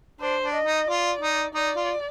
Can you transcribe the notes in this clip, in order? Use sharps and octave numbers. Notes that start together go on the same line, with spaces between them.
D4 C5
D4
D#5
D#4
F4 D5
D#4
D#4 D5
F4